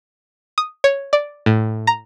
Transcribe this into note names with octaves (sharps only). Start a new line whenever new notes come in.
D#6
C#5
D5
A2
A#5